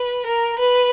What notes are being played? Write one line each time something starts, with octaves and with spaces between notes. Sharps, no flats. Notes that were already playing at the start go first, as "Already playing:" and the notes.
Already playing: B4
A#4
B4